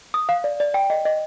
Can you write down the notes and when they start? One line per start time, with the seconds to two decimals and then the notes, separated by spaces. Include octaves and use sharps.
0.14 D#6
0.29 F5
0.44 D5
0.60 D5
0.74 G5
0.90 D#5
1.05 D#5